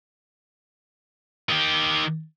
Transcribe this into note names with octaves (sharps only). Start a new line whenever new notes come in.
D#3 G4